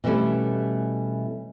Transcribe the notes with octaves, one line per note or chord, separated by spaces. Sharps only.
B2 E3 G3 A3 C#4 E4